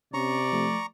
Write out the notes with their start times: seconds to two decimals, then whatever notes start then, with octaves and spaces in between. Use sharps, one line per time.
0.14 C3 C#4 D5 A#5 C#6
0.52 F3 A3